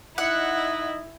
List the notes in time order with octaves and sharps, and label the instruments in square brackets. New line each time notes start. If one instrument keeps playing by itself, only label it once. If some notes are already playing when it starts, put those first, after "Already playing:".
[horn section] D#4 D#5 [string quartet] E4 [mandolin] F#5